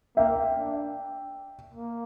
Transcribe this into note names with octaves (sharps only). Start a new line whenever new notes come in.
A#3 E5 G5
D4
A#3